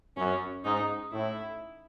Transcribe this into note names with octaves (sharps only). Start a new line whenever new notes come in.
F#2 C#4
G#2 D#4
A2 E4